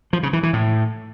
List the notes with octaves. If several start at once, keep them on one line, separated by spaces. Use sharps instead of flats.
F3
C#3
E3
E3
A2